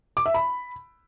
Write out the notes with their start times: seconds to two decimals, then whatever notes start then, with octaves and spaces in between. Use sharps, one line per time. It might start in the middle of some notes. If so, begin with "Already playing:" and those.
0.17 D6
0.26 E5
0.34 B5